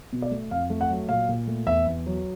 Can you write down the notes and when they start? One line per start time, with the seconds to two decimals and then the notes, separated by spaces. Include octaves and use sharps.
0.13 B2
0.22 D5
0.31 A3
0.51 F2 F5
0.70 A3
0.81 F#5
0.90 F#3
1.09 A#2 F5
1.29 A#2
1.47 A3
1.67 E2 E5
1.87 E2
2.06 F#3